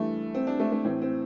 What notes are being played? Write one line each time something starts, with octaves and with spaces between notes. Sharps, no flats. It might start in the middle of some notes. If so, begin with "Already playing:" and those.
Already playing: G2 E3 A3
C4
D4
A3
A3
A2 E3 C4
C4